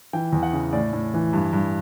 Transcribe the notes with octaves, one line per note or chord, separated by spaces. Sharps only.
E3 G5
E2
F#5
C#3
A2 D5
A2
E3
G2
G2